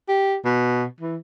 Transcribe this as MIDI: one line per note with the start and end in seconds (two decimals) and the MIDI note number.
0.08 0.35 67
0.45 0.85 47
1.00 1.16 52